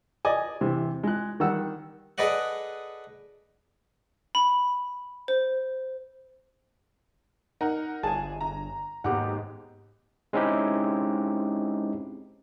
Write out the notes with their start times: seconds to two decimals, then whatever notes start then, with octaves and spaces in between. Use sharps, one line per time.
0.25 D5 D#5 G#5
0.61 C3 E3
1.03 G#3 F#6
1.40 D#3 G3 F#5 E6
2.18 G#4 A4 B4 D5 D#5 F#5
4.35 B5
5.28 C5
7.61 D#4 A#4 F#5
8.03 G1 G#4 G#5 A5
8.41 A#5
9.04 D#2 G#2 B2 G4 F#5
10.33 G#3 C4 C#4 D#4 E4 G4